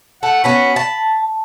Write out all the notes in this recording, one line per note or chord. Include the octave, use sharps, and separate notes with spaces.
A3 F#5
B3 C#4 F#4 B5
A5